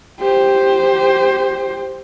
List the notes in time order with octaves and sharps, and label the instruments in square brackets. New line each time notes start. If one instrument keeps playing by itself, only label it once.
[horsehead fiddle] G4 C5